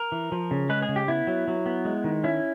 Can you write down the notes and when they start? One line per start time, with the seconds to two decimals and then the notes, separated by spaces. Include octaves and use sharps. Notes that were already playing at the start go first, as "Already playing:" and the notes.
Already playing: A#4
0.12 E3
0.32 F3
0.51 C#3
0.69 G#3 B4
0.82 G#4
0.89 C#3
0.96 G4
1.08 B3 E4
1.27 F#3
1.48 F#3
1.66 B3
1.85 G#3
2.04 D#3
2.24 C#4 E4